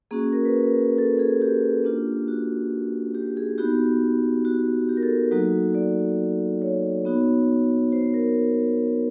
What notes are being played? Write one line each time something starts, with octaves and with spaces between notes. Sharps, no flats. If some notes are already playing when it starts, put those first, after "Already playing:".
A#3 C#4 F#4 G#4
A#4
B4
A#4
A4
G#4
G4
A#3 D4 F4
F#4
G4
G#4
B3 D#4 F#4 G4
F#4
G4
A#4
A4
A4
F#3 A#3 D#4 F#4
D5
C#5
B3 D#4 F#4
C5
A#4